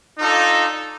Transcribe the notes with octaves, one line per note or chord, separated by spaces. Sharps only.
D4 D#4 F4 A4